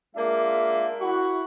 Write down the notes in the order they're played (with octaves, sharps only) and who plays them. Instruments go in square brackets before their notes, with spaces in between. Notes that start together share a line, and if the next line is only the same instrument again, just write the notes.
[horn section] G#3 A#3 D4 F4 E5
E4 F#4